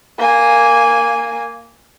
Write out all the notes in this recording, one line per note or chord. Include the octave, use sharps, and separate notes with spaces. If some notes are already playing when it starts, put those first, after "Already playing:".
A#3 G#5